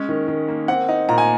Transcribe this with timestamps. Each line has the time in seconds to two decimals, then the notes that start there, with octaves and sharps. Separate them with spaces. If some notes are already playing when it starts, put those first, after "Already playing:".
Already playing: G#3 C#4
0.09 D#3
0.28 D#3
0.48 A#3
0.68 C4 F#5
0.89 D#4
1.09 A#2 A#5
1.18 G#5